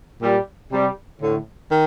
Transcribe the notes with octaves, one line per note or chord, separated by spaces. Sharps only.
A#2 G3
C3 G3
A2 D3
D#3